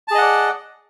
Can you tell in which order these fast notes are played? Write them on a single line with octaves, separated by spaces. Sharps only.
A5 G#4 D#5 F#5 D5